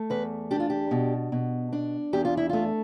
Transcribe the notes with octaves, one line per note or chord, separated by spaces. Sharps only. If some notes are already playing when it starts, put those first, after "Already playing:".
Already playing: A3
E2 B4
D4 G4
F4
G4
B2
B2
D4
E2 G4
F4
E4
A3 F4